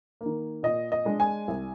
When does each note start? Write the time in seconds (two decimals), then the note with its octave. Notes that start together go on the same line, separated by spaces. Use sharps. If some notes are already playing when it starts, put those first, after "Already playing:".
0.21 A#3
0.26 D#3
0.63 A#2 D#5
0.92 D#5
1.05 G#3 D4
1.20 G#5
1.48 C2